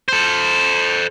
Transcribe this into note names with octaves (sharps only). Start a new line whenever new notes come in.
A4 C5